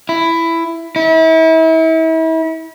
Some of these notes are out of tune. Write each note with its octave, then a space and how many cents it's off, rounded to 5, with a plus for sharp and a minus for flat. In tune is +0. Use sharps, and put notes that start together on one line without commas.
E4 +10
E4 -35